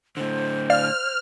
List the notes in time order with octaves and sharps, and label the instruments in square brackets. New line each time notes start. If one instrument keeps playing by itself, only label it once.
[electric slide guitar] A2 D3 [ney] C5
[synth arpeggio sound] D5 F5 [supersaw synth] F6